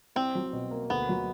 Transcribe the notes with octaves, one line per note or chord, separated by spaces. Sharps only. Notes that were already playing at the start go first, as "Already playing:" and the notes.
C2 C4
F#3
B2
A#3
D2 B3
F#3